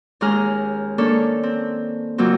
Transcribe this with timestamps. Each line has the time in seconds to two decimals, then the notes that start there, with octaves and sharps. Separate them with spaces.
0.21 D#2 G#3 C#4 G#4 A#5 F6
0.98 D#3 A#3 C#4 D4 A4 C#5
1.43 C4
2.18 F2 C#3 F#3 A#3 C4